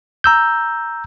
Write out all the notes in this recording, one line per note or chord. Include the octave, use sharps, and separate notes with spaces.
A#5 E6 G6